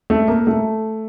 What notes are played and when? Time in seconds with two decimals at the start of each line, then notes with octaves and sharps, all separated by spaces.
0.10 A3
0.28 A#3
0.47 A3